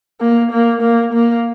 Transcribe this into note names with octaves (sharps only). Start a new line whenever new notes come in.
A#3
A#3
A#3
A#3